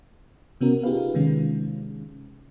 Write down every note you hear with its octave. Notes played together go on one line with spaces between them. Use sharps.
C3 B3 C#4 F#4 A#4
D#4 F4 G4 G#4 B4 F5
C3 D#3 G#3 C#4